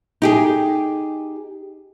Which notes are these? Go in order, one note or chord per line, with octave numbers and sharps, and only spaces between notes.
D#4 G4 G#4